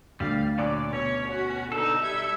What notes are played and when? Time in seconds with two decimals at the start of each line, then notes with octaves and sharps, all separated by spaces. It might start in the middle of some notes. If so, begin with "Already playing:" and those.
0.20 D2 G3 F5
0.58 A#2 D3 F#3 D5
0.93 B2 C#4 C#5
1.28 F#4
1.72 D3 D#4 A4
2.04 G3 E5 G#6